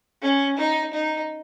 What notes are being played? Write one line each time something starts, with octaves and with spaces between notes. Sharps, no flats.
C#4
D#4
D#4